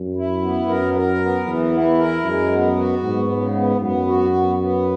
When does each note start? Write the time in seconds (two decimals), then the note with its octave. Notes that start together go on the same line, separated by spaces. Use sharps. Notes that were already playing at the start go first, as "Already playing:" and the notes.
Already playing: F#2
0.16 E4
0.41 B3
0.68 F#2 A#4
0.94 A#4
1.20 B3
1.47 E2 E3
1.72 E4
1.98 A#4
2.24 F#2 G#3
2.51 B3
2.77 F#4
3.03 G#2 B3
3.29 C#3
3.55 B3
3.81 F#2 B3
4.07 F#4
4.34 B3
4.59 B3